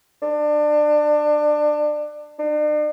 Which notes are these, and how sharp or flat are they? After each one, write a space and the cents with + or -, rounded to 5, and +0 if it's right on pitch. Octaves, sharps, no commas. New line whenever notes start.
D4 +25
D4 +45